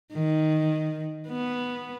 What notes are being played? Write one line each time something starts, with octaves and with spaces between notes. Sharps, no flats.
D#3
B3